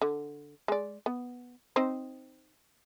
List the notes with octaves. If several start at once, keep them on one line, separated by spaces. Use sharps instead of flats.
D3
G#3 D5
B3
C4 D#4 C5